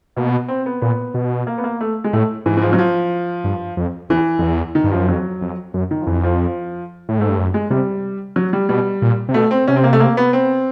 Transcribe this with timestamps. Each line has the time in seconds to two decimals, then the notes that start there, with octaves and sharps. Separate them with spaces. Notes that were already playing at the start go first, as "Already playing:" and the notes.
0.16 B2 A#3
0.27 B3
0.48 C4
0.66 B3
0.82 A#2 B3
1.14 B2
1.47 A#3
1.58 B3
1.64 A#3
1.81 A3
2.04 G#3
2.13 A2 A3
2.46 G#2 E3
2.57 E3
2.62 F3
2.73 F#3
2.79 F3
3.44 G2
3.77 F2
4.09 E2 E3
4.39 F2
4.42 E2
4.75 D#3
4.84 G2
4.92 F#2 F3
5.08 F2 F#3
5.41 F2
5.74 F#2
5.91 D#3
6.01 F3
6.07 F2 E3
6.23 F3
7.09 A2
7.19 G#2 A3
7.28 G2
7.38 F#2
7.54 G#3
7.70 C3 G3
8.36 F#3
8.53 G3
8.69 B2 G3
9.02 A#2
9.29 C3
9.34 B2 A3
9.51 C4
9.68 C3 C#4
9.76 C4
9.84 A#3
9.93 A3
10.00 A#3
10.17 B3
10.33 C4